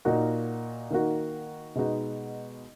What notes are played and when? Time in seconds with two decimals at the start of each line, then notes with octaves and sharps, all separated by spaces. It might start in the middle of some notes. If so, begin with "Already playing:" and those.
0.05 A#2 A#3 D#4 F#4
0.91 D#3 A#3 D#4 F#4
1.75 B2 G#3 B3 D#4 F#4